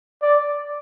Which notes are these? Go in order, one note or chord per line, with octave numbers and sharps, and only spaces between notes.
D5